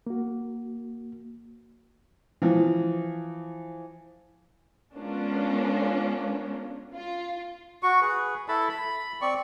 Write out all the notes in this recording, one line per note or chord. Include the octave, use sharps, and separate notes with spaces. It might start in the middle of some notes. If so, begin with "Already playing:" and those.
A#3 F#4
E3 F3
G#3 B3 C#4 D4 F4 A#4
F4
F#4 C#6
G#4 B4
E4 A4 A5 B5
B5
C4 D5 C#6